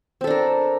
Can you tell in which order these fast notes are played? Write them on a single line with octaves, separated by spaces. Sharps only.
C4 A4 D4 A#4